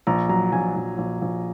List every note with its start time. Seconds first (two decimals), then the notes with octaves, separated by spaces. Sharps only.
0.07 A#1 A#5
0.29 F#3 A#5
0.52 A#1 G#5
0.76 A#1
0.98 A#1
1.22 A#1